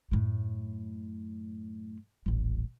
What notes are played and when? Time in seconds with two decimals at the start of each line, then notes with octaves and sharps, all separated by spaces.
0.11 F#2 A2
2.26 D#1 A1